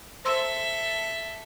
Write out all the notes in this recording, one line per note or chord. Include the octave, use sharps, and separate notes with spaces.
A4 C5 E5 C6 E6